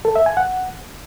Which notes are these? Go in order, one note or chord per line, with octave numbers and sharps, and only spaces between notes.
A4
E5
G#5
F#5